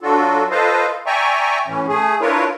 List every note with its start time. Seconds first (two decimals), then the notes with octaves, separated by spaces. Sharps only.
0.01 F#3 D4 F4 F#4 A4
0.51 F4 A4 B4 C5 D#5 F5
1.06 D5 E5 G5 G#5 A#5 C#6
1.67 A2 E3 C#4
1.88 A3 G#4
2.21 D4 E4 F4 A#4 B4 C#5